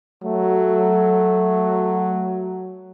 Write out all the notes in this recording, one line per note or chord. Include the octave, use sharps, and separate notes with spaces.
F#3 A3